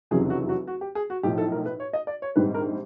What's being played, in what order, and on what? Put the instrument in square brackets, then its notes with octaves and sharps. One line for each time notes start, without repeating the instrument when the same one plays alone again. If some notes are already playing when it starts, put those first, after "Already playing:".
[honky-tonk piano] F1 E2 C#3 F#3 [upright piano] G#4
[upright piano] F#4
F#4
F#4
G4
G#4
F#4
[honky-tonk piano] B1 A2 F3 [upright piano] G4
[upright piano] A4
A#4
B4
C#5
D#5
D5
C#5
[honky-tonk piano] A#1 G#2 D#3 G3 C4 [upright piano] B4
[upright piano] A#4